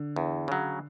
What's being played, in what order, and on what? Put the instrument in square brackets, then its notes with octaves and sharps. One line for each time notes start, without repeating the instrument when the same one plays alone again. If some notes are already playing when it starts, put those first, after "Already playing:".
Already playing: [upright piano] D3
[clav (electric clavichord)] E2
C#3 F#3